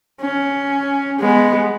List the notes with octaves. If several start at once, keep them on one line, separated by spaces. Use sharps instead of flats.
C#4
G#3 B3